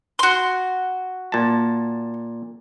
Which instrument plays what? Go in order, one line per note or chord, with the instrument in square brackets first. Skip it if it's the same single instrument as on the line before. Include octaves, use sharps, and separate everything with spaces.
[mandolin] F#4 C6
[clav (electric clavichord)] A#2 A5